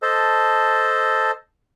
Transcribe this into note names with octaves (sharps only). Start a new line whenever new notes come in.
A4 C5 D#5 A5